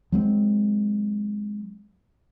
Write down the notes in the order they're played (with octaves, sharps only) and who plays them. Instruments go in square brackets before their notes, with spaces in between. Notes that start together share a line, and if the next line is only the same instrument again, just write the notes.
[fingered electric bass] F#3 G#3 A#3 C4